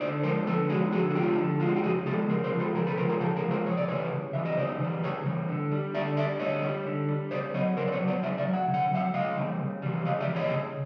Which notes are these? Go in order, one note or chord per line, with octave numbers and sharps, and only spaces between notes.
D3 C5 D5
F3 G#3 A#4 C5
D3 A4 B4
F3 G#3 F#4 G#4
D3 F#4 G#4
F#4
F3 G#3 F4 G4
D3
F3 G#3 F4
F#4
G4
C#3 F#4 G#4
F3 G#3 G4 A4
C#3 G#4 A#4
A#4 C5
F3 G#3
A4 B4
C#3 G#4 A#4
A4 B4
F3 G#3 A#4 C5
G#4 A#4
C#3 G4 A4
G#4 A#4
F3 G#3
A#4 C5
C#3 C#5
D5
E3 G3 B4 C#5
C#3
E3 G3 E5
D#5
C#3 C5 D5
E3 G3
C#3 B4 C#5
E3 G3
D3
G3
D3 D5 E5
G3 D5 E5
D3 C#5 D#5
G3
D3
G3
C#3 C5 D5
F#3 C#5 D#5
C#3 A#4 C5
D5
B4 C#5
F#3
C5 D5
C#3 D5 E5
D5 E5
F#3
F#5
C#3
F#5
F#3 E5 F#5
C#3 D#5 F5
E3 G3
C#3
E3 G3
C#3 D#5 F5
D5 E5
E3 G3
C#5 D#5
C#3